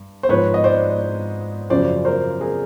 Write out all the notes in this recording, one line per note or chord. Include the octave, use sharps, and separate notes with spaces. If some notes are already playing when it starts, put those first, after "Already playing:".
Already playing: G2
C5
G#2 F3 B4 C#5
D#5
C5 D5
F#2 C#3 F3 C5 D5
A#4 C5
G#4 A#4